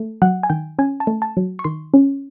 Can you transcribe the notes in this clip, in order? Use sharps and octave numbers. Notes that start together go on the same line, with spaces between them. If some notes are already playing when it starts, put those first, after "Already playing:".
Already playing: A3
F#3 F#5
G#5
D#3 G5
C#4 G#5
A5
A3
A5
F#3
C#6
D#3 C6
C#4